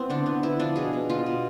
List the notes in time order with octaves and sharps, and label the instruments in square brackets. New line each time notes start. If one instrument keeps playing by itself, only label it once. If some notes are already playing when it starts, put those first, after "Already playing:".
Already playing: [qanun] B3 C4 E4
D3 D4
B3
B3 E4
F3 D4
B2 G#4
B2
B3 F4
B2